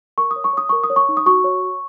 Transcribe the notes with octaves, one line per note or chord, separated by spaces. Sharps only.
A#4 C#6
D#6
C#5
C#6
C#5 D#6
A#4 C#6
D#6
C#5
C#6
D#4
D#6
F#4 C#6
C#5
C#5